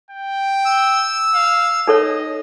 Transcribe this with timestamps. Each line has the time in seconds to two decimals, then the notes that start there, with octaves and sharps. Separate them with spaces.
0.10 G5
0.65 E6
1.35 F5
1.87 D#4 A4 C#5 D#5